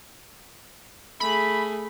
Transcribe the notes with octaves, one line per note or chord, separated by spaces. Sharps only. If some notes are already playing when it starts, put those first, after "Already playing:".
A3 G#4 B5